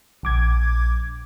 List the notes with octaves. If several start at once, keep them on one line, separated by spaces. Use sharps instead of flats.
A#1 D6 G#6